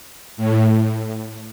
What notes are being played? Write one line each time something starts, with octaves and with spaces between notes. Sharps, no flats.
A2